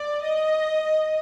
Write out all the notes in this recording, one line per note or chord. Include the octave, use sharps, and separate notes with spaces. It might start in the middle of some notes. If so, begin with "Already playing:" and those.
Already playing: D5
D#5